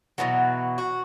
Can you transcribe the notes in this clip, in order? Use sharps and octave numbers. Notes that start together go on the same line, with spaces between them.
B2 D#3 E3 F#3
F#4